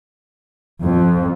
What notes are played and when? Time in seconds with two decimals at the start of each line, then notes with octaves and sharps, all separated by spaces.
0.82 F2